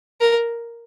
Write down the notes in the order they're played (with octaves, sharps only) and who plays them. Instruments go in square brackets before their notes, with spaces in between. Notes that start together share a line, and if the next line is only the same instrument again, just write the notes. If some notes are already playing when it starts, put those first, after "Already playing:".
[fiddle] A#4